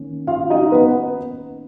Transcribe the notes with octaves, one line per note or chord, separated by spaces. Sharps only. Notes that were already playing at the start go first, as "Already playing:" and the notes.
Already playing: D#3 A#3 C#4
F4 F5
D#4 D#5
B3 B4